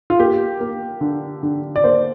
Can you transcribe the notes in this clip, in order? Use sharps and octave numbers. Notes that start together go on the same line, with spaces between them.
F4
A#3 G4
A#3
D3
D3
D5
A#3 C5